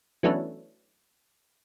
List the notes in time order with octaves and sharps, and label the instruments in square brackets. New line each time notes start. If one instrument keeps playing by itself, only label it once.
[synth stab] E3 F#3 A3 B3 C#4 D4